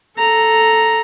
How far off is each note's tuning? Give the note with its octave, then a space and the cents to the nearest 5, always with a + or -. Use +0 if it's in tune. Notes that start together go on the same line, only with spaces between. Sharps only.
A4 +0 A#5 +0